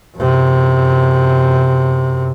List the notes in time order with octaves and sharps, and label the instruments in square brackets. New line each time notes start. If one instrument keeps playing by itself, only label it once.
[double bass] F#2 C3